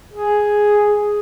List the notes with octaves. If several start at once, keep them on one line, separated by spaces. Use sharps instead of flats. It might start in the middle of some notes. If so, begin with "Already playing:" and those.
G#4